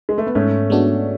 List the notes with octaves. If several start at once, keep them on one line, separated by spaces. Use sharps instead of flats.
G#3
A3
B3
G#2 A3 C#4
G#3 B3 D4 F#4